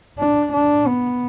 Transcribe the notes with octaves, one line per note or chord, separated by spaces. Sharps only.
D4
D4
B3